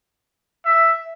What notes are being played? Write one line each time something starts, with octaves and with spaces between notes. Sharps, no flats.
E5